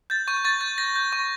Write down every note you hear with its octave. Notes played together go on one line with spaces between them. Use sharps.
G6 A6
C#6 G6
C#6 A6
G6
G6 A#6
G6
C#6